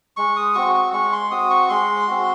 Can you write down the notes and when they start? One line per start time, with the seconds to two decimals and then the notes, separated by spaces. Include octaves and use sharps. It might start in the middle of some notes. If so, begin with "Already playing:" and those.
0.17 G#3 C#6
0.36 D#6
0.55 C4 F#4 C#6
0.75 C#6
0.93 G#3 C#6
1.13 C6
1.31 C4 F#4 D#6
1.50 C#6
1.69 G#3 C6
2.07 C4 F#4